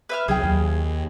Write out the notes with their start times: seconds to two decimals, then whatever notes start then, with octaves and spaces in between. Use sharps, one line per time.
0.09 B4 E5 F6
0.28 C2 F#3 G#4 G5
0.43 D#2